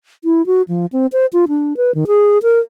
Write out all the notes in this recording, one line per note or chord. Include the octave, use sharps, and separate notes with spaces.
E4
F#4
F3
C4
C5
F4
D4
B4
D#3
G#4
A#4